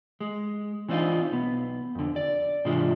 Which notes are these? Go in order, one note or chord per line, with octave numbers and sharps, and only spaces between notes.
G#3
E3 C4 D4 D#4 F4
B1 B3
F2 D3
D5
G#2 C3 E3 G#3 D4 F4